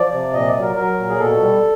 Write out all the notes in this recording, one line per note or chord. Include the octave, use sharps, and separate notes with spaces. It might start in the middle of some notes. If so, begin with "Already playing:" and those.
Already playing: F3 D5
C3
A#2 D#5
D5
F#3
A#4
F#3 A#4
A#2
G#4
B2 A4
G3